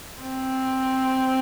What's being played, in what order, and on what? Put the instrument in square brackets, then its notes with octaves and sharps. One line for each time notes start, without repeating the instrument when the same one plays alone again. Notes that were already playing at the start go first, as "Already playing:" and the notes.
[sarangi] C4